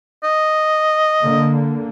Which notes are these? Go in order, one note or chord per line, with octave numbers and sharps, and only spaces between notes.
D#5
D3 A#3